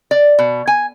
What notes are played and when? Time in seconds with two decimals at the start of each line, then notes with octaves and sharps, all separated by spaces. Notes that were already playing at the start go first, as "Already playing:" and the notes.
0.11 D5
0.39 B2
0.67 G#5